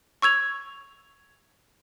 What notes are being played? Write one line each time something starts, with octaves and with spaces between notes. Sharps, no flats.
C#6 E6 G#6 F7